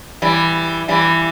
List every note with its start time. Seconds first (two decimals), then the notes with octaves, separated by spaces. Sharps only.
0.22 E3 G3
0.88 E3 G3